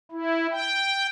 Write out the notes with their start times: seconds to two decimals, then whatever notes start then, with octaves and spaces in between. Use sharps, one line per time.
0.12 E4
0.51 G5